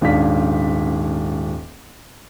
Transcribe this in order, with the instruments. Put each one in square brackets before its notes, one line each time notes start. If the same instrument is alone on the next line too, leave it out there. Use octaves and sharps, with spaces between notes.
[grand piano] D#1 G#2 C#4 D4 F5 B6